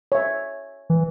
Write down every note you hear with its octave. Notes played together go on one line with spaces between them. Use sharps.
C#5 E5
E3